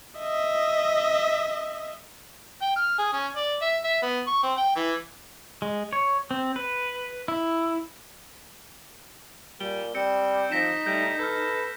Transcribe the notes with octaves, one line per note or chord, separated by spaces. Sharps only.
D#5 E5
G5
F6
G#4
C#4
D5
E5
E5
B3
C#6
C4
G5
E3
G#3
C#5
C4
B4
E4
A#2 G3 G7
G3 C4 C#7
F3 D#4 A#6 B6 E7
G3 A3 G6
A4 B4 F6 G6